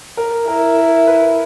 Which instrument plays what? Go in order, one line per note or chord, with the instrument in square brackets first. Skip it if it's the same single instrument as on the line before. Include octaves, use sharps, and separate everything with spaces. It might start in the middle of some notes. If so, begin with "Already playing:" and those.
[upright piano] A#4
[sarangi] E4 [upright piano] A#4
[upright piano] A#4
B4